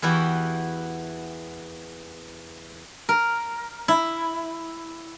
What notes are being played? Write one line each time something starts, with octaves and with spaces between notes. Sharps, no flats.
E2 E3 E4 F#4 G4
A#4
E4